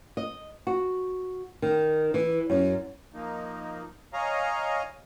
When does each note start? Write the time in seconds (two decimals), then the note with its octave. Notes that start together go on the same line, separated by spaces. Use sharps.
0.17 D#5
0.67 F#4
1.62 D#3
2.14 E3
2.50 F#2
3.14 F3 A#3 D#4
4.13 C#5 D#5 F5 G#5 A#5